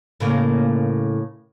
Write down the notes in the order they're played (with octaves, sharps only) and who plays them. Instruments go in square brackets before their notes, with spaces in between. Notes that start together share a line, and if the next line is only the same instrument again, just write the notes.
[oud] A2 C#3 A#3